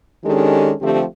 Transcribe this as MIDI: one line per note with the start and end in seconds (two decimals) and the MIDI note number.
0.25 0.72 51
0.25 0.72 56
0.25 0.72 61
0.25 0.72 62
0.25 0.72 67
0.25 0.72 69
0.81 1.03 50
0.81 1.03 53
0.81 1.03 57
0.81 1.03 60
0.81 1.03 67